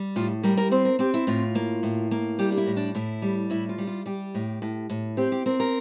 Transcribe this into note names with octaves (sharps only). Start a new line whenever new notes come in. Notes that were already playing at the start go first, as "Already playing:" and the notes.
Already playing: G3
A2 F4
G3 A#4
A#4
C4 C5
A#4
C4 G4
E4
A2 F4
A#3
A2
A#3
G3 G4
D4
E4
A2
D4
A2 E4
G3
A2 E4
F4
G3
F4
G3 G4
A2
A2
A2
C4 G4
G4
C4 A#4
A#4